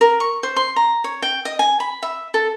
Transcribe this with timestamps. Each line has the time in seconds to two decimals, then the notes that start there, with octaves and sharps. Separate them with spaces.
0.01 A#4
0.20 C#6
0.43 C5
0.56 C6
0.76 A#5
1.04 C#5
1.22 G5
1.45 D#5
1.59 G#5
1.80 B5
2.03 E5
2.34 A4